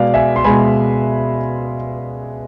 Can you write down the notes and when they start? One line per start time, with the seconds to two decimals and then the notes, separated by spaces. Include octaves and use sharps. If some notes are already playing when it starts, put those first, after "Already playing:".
Already playing: B2 G#3 G#4 B4 D5 F5
0.14 E5 G#5
0.36 C6
0.44 B2 G#3 G#5 B5